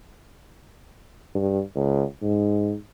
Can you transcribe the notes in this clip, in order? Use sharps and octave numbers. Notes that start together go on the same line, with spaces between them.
G2
C#2
G#2